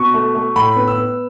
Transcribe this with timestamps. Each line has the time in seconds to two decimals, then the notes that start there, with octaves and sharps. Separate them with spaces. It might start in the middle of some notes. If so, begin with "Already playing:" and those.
Already playing: B2 C#6
0.14 A3
0.35 A3
0.56 A2 B5
0.76 B3
0.88 E6
0.97 B3